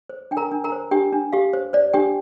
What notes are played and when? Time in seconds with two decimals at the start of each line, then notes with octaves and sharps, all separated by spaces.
0.09 C5
0.31 D4 G5
0.37 A#4 A#5
0.52 D4
0.64 A#4 A#5
0.72 C5
0.91 D4 G4 G5
1.13 D4
1.33 G4 F5
1.53 C5
1.73 C5 D5
1.93 D4 G4 G5